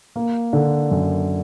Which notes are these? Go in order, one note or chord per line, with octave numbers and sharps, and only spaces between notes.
A#3
D3
F#2